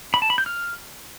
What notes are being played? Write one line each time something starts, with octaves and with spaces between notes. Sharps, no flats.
B5
A5
B5
G6
F6